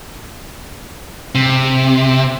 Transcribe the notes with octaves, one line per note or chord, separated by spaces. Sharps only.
C3